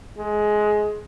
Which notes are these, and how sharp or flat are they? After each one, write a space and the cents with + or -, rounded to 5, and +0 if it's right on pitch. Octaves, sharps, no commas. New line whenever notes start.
G#3 +15